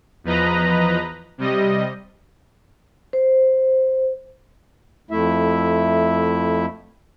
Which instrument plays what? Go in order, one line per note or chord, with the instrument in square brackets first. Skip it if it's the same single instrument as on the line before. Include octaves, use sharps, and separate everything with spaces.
[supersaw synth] E2 F3 B4 D#5 A#5
C3 G3 D#5
[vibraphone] C5
[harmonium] F2 A3 E4 E5